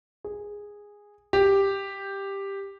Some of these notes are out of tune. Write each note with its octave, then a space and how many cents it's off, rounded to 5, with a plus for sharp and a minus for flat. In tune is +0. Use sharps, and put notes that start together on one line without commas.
G#4 -10
G4 +5